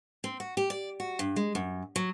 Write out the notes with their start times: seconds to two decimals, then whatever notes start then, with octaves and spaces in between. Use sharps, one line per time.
0.24 C4
0.40 F#4
0.57 G4
0.70 D5
1.00 F#4
1.19 G2
1.36 G#3
1.55 F#2
1.96 F#3